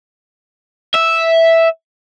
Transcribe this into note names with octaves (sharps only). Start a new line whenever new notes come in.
E5